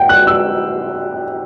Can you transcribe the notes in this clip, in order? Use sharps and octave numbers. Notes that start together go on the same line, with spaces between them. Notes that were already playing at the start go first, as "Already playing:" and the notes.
Already playing: F#5 G5
F#6
E6